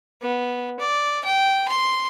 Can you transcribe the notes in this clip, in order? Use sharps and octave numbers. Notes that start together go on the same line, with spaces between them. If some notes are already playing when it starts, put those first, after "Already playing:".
B3
D5
G5
C6